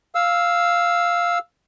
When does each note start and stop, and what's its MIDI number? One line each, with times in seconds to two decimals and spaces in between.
0.15 1.38 77
0.15 1.38 88